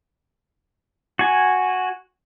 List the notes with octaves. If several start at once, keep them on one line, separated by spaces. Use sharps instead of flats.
F#4 G#5